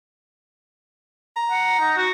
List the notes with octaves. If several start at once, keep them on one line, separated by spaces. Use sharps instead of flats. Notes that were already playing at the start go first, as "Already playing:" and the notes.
A#5
F#5
D#4
F#4